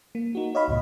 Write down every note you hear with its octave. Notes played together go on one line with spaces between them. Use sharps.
A#3
D#4 F#4
C#5 D#5 F5 B5
C#2 G2 A#2